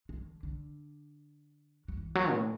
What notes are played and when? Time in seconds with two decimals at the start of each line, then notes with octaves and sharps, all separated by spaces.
0.09 G#3
0.25 D3
0.43 D3
1.88 F#3
1.97 E3
2.15 F#3
2.32 A2